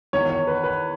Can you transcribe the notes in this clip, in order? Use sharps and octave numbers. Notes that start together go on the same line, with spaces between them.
E2 D#3 C#5
C#5
B4
B4